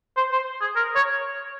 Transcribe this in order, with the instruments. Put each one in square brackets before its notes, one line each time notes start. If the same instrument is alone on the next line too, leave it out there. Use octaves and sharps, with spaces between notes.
[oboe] C5
C5
G#4
A#4
C#5